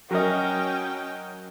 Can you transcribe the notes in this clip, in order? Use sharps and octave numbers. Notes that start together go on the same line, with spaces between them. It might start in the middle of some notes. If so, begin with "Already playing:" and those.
F#3 C#4 A#4 D#5 G5